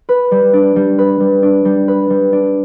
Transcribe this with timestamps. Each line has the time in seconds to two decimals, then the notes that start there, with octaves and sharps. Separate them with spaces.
0.09 B4
0.31 G3
0.53 D4
0.76 G3
0.98 B4
1.20 G3
1.42 D4
1.65 G3
1.88 B4
2.10 G3
2.33 D4